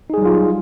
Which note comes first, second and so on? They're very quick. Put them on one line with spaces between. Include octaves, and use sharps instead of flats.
D#4 G#4 G3 F#3 F4